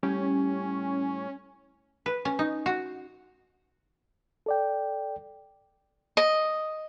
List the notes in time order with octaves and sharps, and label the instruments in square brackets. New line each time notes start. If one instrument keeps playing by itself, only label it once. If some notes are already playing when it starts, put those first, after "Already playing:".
[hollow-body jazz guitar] A2 G3 G4 [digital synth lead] C#4
[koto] B4
C#4
D#4
F#4
[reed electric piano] A4 D5 G5
[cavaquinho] D#5